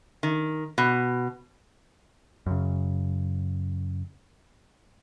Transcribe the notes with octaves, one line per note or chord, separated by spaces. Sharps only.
D#3
B2
F#2 C#3